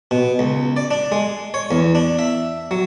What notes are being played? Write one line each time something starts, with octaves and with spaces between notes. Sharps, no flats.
B2
C#2
D5
D4
G#3
C#5
E2
D4
E5
F#3